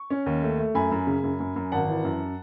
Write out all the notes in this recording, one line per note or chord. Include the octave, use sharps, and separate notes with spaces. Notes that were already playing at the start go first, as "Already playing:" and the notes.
Already playing: C#6
C#4
D#2
A3
A3
F#2 G#5 B5
F#2
C#3
F#2
F#2
F#2
G#1 F#5 A5
E3
F#2